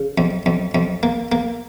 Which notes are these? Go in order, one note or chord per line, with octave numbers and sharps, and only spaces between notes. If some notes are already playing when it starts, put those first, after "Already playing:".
Already playing: C#3
F2
F2
F2
A#3
A#3